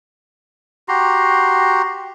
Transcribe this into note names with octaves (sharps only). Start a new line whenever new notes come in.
F#4 G4 A#5 C6